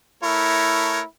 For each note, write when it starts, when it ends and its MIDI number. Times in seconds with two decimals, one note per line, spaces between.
0.23 0.99 57
0.23 1.06 64
0.23 0.99 70
0.23 0.99 73